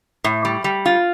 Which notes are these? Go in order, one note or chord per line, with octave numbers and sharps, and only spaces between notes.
A2
G3
G3
F4